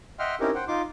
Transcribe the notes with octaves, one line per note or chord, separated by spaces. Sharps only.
D#5 E5 F#5 G5 C6 F6
C4 C#4 D#4 E4 G4 A#4
C5 F#5 G5
D#4 F4 C6 D6